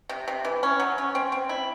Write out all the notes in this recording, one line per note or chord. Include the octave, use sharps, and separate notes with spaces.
C3
C3
E3
C#4
F#3
C#4
C4
C4
E4